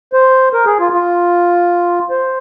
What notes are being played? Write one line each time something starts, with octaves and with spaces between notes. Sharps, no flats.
C5
A#4
G#4
F4
F4
C5